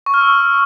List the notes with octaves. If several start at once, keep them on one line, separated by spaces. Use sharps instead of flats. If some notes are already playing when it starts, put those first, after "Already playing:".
C#6
F6
E6